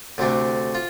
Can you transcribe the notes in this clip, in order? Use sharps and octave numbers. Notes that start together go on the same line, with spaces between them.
D2 C3 A3 D4
F4